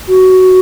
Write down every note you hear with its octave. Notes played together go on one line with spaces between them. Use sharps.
F#4